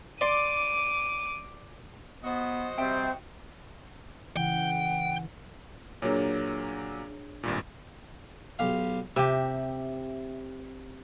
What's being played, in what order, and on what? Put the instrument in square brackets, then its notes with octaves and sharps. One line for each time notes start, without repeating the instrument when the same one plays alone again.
[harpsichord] D5 C6 [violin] D6 D#7
[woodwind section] B3 [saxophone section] F#4 C5 D#5
[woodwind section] C3 G3 [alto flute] C4 [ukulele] E5 G5
[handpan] C#3 E3 [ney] F#5 [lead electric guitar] G5
[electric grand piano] A#2 F#3 A#3 [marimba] D4 G#4 C#5
[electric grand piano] G#1 G2 A#2
[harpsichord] B1 G4 F5
[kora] C3 G4 [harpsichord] E5